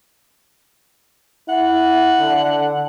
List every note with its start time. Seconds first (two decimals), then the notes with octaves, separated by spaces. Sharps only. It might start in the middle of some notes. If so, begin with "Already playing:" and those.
1.49 E4 F#5
2.19 D3